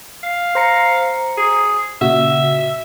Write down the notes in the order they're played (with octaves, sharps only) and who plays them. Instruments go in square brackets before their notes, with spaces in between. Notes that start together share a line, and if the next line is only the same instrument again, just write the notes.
[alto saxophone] F5
[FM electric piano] C5 A#5 C#7
[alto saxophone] G#4
[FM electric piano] A#2 C#3 F#4 [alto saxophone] E5